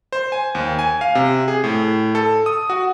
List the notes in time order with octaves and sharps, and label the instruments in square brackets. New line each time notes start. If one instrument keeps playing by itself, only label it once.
[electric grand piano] C5
G#5
D#2
G#5
F5
C3
G#4
A2
A4
D#6
F#4